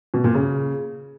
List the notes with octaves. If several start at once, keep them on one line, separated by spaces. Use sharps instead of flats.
B2
A#2
C#3